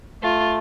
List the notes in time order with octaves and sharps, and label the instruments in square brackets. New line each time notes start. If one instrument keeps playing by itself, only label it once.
[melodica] A3 [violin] F4